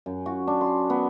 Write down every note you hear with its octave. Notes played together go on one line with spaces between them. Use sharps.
F#2
F#4
D4
C6
B3